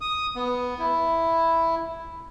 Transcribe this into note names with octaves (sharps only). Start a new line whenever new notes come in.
D#6
B3
E4